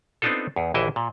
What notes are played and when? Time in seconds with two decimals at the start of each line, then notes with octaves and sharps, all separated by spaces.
0.22 B3 C4 D4 D#4 F4 A4
0.56 E2
0.74 A#1 D#2 E3 E4 D#5 E5
0.96 A#2